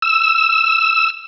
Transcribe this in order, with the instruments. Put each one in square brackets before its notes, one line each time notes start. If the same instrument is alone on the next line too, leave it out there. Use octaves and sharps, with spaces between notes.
[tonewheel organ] E6